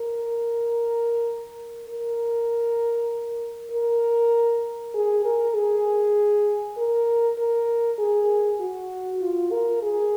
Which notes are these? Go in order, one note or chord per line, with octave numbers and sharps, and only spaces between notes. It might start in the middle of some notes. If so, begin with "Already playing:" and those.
Already playing: A#4
A#4
A#4
G#4
A#4
G#4
A#4
A#4
G#4
F#4
F4
A#4
G#4